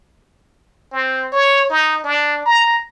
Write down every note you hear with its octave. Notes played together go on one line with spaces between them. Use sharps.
C4
C#5
D#4
D4
A#5